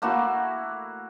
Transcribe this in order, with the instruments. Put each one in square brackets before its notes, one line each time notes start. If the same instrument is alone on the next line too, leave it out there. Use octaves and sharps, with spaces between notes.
[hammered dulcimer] A3 A#3 E4 F#4